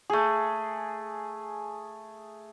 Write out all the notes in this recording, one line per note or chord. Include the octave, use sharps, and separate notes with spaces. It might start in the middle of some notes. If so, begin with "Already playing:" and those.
A3 G#4